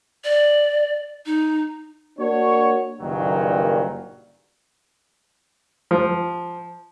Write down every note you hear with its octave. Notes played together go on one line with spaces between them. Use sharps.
D5
D#4
A#3 D4 F#4 C#5
F#1 G2 A#2 D#3 F#3
F3